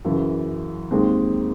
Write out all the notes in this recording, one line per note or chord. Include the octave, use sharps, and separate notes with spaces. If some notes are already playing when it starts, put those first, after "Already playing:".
F#2 C#3 E3
D#2 D#3 G#3 C4